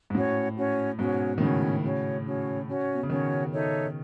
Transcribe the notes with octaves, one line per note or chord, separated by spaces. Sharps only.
G#2
A2 C#4 F#4 C#5
C#4 F#4 C#5
G#2 B2 C#4 F#4 C#5
D#3
A2 C#3 C#4 F#4 C#5
C#4 F#4 C#5
C#4 F#4 C#5
C#4 F#4 C#5
B2
C#3
B2 D#3 C#4 F#4 C#5
D#4 A4 C#5 E5